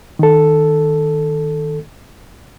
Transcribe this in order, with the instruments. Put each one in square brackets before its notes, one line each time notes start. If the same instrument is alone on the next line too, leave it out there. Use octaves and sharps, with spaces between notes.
[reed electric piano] D#3 A4